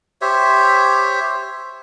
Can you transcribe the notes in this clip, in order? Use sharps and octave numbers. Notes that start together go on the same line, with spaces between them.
G4 C5 C#5 E5